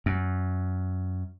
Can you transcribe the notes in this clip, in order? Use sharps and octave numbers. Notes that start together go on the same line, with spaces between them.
F#2